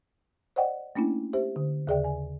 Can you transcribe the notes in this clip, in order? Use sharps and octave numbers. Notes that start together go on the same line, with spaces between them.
C5 D5 D#5 F#5 G5
A3 A#3 C#4 D4 E4
G4 C5 E5
D3
D#2 C#3 G#4 D5 E5 G5
G#5